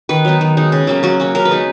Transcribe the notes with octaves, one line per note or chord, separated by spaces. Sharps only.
D#3 B4
F#3 B3 D#4
D#3
G#3 D#4
C#3
F#3 A#3 C#4
F#3 F#4
A#3 C#4
C#3 A#4
B4
G#3 B3 D#4